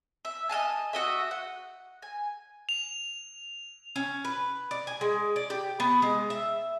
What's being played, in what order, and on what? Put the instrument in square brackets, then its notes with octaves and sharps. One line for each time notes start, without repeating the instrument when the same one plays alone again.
[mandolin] E5
D#5 F5 G#5 A5
F#4 D#5 E5
F#5
G#5
[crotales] F7
[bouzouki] C#4
B4
D5
G#5
G#3
D5
G4
B3
G#3
E5